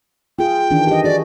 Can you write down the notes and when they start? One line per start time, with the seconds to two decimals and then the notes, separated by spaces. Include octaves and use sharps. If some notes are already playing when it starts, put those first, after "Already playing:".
0.39 F4 G#4 G5
0.71 D#3 E3 D4
0.87 G4 D#5
1.04 F#4 G#4 D5